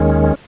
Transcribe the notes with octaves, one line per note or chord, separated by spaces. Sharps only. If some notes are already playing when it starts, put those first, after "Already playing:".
Already playing: D#2 D#3 G#3 C#4